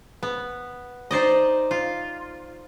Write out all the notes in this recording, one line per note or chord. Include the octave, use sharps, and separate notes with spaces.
B3
D#4 C5 D5 D#5
F4